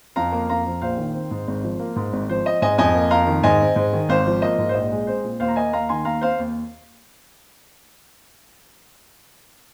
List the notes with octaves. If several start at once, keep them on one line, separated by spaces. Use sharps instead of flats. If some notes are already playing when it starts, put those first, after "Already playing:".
F2 F5 A#5
A#3
F2 F5 A#5
F3
A#1 C5 F5
D#3
C4
G#2
G#1
F3
A#3
G#2
G#1
F3 C5
C4 D#5
G#2 D#5 G#5
F2 D#5 G#5
A#3
F2 F5 A#5
D#3
G#2 D#5 G#5
C4
G#2
D#3
G#1 C5 F5
F3
A#3 D#5
G#2
C5
A#1 D#5
G#3
C4 C5
A#2
D#2 C5 F5
A#5
A#3 D#5 G#5
D#2 F5 A#5
D#3 G#5 C6
D#2 F5 A#5
C4 C5 F5
D#2